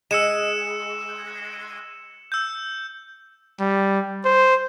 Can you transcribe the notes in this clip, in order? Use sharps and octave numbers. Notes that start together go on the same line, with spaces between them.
G#3 E6 C#7 E7
E6 G6
G3
C5